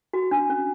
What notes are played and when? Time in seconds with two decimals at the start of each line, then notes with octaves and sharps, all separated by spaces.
0.13 F#4
0.31 D4
0.50 C#4